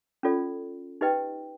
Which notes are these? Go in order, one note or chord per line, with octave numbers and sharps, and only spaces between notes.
C#4 F4 A4 D5
D#4 G4 B4 D#5 G5